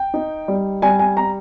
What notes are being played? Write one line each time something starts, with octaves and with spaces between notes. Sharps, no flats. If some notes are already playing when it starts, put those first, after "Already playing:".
Already playing: G5
D#4
G3
G3 G#5
G#5
A#5